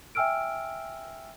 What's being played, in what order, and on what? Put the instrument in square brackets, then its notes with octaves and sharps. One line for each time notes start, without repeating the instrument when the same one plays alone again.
[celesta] E5 G5 G#5 E6 F6 D7